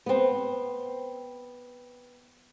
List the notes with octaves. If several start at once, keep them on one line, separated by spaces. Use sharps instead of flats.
B3 C4